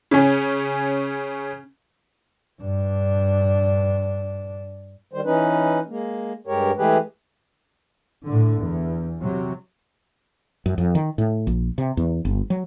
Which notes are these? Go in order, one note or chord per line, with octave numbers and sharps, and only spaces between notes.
C#3 C#4
G2 D4
D#3 G3 C5
E3 C#4 D#4 B4
G#3 A#3
G2 G#3 G4 A#4 C#5
E3 G#3 A3 G4 G#4 B4
A2 D3
E2
C3 F#3
F#2
F2
D#3
A2
A#1
C3
E2
G1
F#3